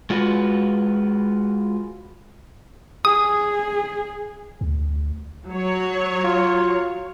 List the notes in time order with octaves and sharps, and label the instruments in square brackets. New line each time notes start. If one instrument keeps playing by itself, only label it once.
[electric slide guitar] G#3 F4 F#4 B4
[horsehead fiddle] G#4 [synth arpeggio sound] D#6
[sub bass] D2
[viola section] F#3 C#5
[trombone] F4